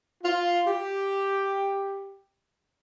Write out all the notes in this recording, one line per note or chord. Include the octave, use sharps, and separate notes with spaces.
F4
G4